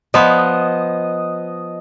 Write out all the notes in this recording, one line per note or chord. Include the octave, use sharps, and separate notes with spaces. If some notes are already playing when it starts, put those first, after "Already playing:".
F3 B3 D#5